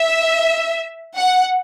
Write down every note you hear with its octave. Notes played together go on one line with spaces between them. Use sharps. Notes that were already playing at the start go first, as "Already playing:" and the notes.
Already playing: E5
F#5